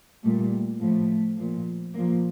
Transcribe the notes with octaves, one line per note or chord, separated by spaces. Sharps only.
A#2 G3 A3
A2 F3 A3
A#2 F3
A#2 F3 A#3